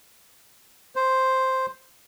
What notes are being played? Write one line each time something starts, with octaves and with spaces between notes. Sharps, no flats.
C5